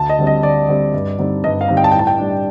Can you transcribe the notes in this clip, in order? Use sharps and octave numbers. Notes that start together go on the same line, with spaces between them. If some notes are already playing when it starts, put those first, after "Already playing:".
Already playing: D2 A5
D#5
D3 G3 C4
D#5
D2 D5
D3 G3 C4
G2
D3 G3 C4 D#4
G2 D#5
F5
D3 G3 C4 D#4
G5
A5
A2 G5
A5
G5
G3 D4